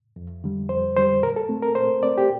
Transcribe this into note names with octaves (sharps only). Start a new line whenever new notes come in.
F2
D3 G3
F2 C5
D3 G3 C5
A#2 A#4
A4
A3 C4
A#4
A#2 C5
A3 C4 D5
G4